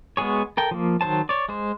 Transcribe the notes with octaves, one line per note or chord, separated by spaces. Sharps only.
G#3 B3 F#4 G#4 C#5
A4 A#4 G5
F3 A#3
D#3 F#3 C5 A5
C#5 D5
G#3 C5